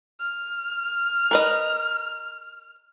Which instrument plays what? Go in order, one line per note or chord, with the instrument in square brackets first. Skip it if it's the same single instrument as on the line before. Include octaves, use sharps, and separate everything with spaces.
[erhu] F6
[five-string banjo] A#4 B4 D#5